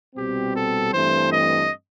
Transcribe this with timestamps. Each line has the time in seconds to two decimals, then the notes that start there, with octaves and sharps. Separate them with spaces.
0.15 C2 B2 G3 C4 G4
0.54 A4
0.93 G2 E3 A3 C4 C5
1.30 D#5